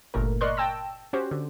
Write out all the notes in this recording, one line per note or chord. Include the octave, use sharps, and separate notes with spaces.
G1 A#2 A3 A#4
A#4 D5 D#5 C6 C#6 F#6
G5 A5 E6 A#6
C#4 F#4 G4 C5
D3